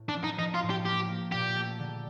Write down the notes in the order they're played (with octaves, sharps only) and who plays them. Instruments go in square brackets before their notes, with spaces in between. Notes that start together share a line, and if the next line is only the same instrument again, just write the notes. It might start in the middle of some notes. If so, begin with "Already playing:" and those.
Already playing: [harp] A2
[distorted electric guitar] D4
[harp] F3
[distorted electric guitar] D#4
[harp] F3 [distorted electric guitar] D#4
[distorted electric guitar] F4
[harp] A2
[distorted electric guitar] G4
[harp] A#3 [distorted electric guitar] G4
[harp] A#3
[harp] A#2 [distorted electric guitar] G4
[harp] A3
D3